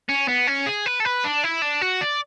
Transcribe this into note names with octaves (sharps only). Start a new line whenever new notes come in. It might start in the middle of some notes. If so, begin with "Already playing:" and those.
C#4
B3
C#4
G#4
B4
A4
B4
D4
E4
D4
F#4
D5